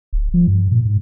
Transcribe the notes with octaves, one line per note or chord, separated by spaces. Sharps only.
D1
F3
G2
A#2
G#2